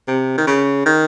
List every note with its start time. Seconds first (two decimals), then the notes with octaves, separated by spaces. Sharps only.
0.08 C3
0.38 D#3
0.47 C#3
0.86 D#3